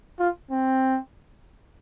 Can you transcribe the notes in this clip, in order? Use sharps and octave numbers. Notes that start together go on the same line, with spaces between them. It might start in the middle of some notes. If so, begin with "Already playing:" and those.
F4
C4